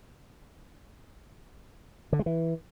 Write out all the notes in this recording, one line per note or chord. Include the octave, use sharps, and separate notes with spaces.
D3
G#3
E3